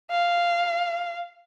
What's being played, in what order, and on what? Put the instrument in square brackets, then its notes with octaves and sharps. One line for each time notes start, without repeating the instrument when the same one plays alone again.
[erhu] F5